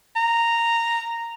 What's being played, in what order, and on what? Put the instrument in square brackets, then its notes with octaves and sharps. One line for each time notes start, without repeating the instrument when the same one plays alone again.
[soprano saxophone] A#5